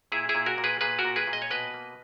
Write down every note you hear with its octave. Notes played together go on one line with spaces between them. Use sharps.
A#2 E4 G#4
E4 G#4
A#2
F#4 A#4
A#2
G#4 B4
A#2 G#4 B4
F#4 A#4
A#2
G#4 B4
A#2
D#5
C#5
B2 B4 D#5
A#3